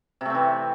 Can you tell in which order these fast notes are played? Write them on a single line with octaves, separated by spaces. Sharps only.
C3 A3 C4 E3